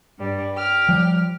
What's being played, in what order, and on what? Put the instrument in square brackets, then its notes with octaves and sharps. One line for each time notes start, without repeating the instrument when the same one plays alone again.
[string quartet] G2 G3
G4 F6
[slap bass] F3 G3